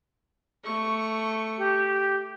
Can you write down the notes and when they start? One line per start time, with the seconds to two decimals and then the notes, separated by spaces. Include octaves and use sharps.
0.64 A3 C#6
1.58 G4